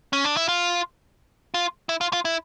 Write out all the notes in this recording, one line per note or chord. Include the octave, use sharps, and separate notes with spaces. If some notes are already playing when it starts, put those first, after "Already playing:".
C#4
D4
E4
F4
F4
E4
F4
F4
E4